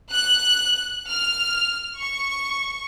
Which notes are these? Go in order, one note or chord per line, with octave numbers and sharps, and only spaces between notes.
F#6
F6
C#6